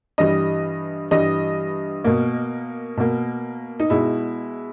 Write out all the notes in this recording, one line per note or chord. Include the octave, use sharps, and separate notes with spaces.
G2 E3 G3 D#5
G2 E3 G3 D#5
B2 A#3
B2 A#3
D#4
B2 G#3 E4